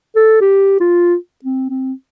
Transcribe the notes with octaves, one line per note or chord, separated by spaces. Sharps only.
A4
G4
F4
C4
C4